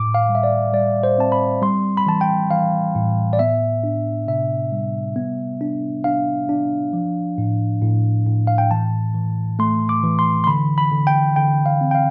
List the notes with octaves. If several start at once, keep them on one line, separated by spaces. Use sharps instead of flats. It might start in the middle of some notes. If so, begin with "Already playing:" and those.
Already playing: A2 D6
F5
G3
E5
D5
G3 D5
C5
C4 A5
B5
G3 C6
B5
E3 A5
G5
E3 F5
A2
D5
B3 E5
D4
C3 E5
G3
B3
D4
D4 F5
D4
F3
A2
A2
A2
F5
G5
E3 A5
E3
A3 C6
D6
E3
C6
C6
D3 B5
B5
D3
G5
D3 G5
F5
C4
G5
F5